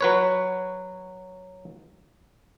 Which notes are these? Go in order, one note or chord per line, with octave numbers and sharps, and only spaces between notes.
F#3 B4 C#5